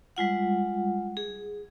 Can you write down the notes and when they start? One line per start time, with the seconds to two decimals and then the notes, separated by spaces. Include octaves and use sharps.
0.17 G3 G#3 F4 F#5
1.17 G#4